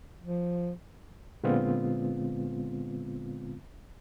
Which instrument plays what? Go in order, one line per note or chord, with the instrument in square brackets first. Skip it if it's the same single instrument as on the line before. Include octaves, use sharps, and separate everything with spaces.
[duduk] F3
[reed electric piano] A#2 D3 G#3 B3 C4 F4